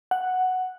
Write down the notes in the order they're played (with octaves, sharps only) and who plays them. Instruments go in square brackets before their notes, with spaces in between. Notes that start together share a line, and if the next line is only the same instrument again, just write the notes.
[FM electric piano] F#5